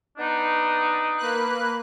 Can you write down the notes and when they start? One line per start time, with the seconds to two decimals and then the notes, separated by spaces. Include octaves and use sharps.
0.18 B3 D4 D#4
1.18 A#3 B4 F#6